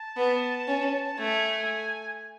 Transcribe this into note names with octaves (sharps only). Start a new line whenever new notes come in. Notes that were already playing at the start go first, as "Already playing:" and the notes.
Already playing: A5
B3
C#4
A3 G#5